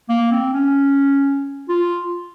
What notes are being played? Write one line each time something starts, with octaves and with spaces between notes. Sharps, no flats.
A#3
C4
C#4
F4